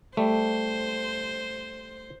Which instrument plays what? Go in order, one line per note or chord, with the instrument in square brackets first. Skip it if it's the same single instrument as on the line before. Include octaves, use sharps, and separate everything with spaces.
[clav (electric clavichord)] G3 A3 [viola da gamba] C5